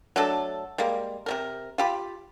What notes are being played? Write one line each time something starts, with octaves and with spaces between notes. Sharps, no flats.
F#3 A3 D4 A4
G3 G#3 A#3
C3 G3 A#4
F4 G4 B5